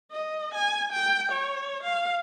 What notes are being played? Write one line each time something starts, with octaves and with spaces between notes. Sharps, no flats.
D#5
G#5
G5
C#5
F5